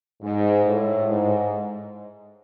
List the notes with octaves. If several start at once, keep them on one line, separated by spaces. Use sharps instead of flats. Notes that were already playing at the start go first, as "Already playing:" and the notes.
G#2
A2
G#2